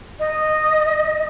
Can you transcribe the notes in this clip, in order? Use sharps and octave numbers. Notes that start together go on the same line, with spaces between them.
D#5